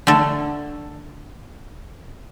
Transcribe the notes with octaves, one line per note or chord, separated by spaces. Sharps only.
D3 A3 A4